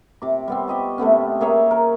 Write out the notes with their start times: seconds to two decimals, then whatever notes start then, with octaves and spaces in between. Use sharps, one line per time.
0.22 C3 D6
0.48 G3 B3 C4
0.68 G4 D#5 C#6
0.98 C3 A3 B3 C#4
1.41 A#3 G#4 C#5 E5
1.71 A#4